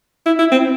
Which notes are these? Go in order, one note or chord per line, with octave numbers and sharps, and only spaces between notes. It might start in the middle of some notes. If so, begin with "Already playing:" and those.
E4
E4
C4